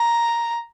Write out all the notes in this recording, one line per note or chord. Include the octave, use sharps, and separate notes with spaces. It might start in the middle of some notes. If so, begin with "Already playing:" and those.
Already playing: A#5